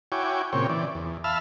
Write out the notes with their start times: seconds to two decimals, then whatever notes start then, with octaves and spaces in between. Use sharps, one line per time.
0.12 E4 F#4 C#5 G5 G#5 D6
0.53 A#2 C#3 C4 C#5 G5
0.69 E3 D5
0.95 E2
1.24 E5 F5 A5 B5 E6 F6